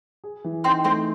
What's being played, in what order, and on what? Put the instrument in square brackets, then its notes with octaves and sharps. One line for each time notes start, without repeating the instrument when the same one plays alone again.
[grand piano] G#4
E3
[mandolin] C4 C5 [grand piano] D#4
[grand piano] A3 [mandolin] C4 C5